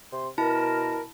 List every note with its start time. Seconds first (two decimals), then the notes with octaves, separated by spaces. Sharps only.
0.12 C3 C6
0.38 B2 E4 A#4 A5